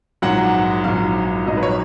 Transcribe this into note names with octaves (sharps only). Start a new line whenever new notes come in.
A#1 G#2 F#3 F#5
A#1 G#2 F#3 F5
A#1 G#2 F#3 D#5
B4
C#5